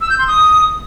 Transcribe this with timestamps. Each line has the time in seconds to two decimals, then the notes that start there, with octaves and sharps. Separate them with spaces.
0.01 E6
0.10 G6
0.19 C6
0.27 D#6